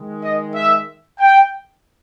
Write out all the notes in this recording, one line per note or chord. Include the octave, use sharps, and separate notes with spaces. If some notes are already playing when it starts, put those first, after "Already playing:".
Already playing: D#3 G#3
D#5
E5
G5